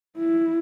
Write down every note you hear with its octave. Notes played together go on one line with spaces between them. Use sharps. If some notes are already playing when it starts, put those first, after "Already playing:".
E4